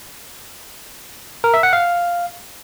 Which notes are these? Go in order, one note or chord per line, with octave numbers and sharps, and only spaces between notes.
A#4
E5
F#5
F5